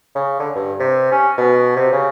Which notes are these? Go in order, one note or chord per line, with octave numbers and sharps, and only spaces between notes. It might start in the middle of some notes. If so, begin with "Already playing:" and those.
C#3
D3
G2
C3
C#4
B2
C3
C#3